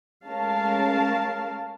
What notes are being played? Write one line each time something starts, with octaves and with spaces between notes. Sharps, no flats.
G#3 A3 C#4 A#4 F5 A5